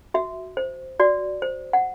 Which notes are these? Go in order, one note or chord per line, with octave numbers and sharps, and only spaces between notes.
F#4 E5
C5
F#4 D5
C5
F#5